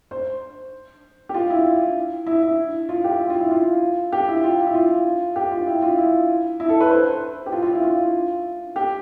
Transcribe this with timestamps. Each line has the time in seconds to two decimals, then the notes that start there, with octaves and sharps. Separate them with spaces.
0.11 C5
1.29 G4
1.34 F4
1.50 E4
1.65 E4
2.26 E4
2.43 E4
2.89 F4
3.04 G4
3.20 F4
3.30 F4
3.40 E4
3.51 F4
4.12 G4
4.28 E4
4.44 F4
4.66 E4
4.74 F4
5.36 G4
5.51 F4
5.67 E4
5.82 F4
5.98 E4
6.60 E4
6.69 A4
6.80 B4
6.90 C5
7.46 G4
7.52 F4
7.62 F4
7.73 E4
7.83 F4
8.76 G4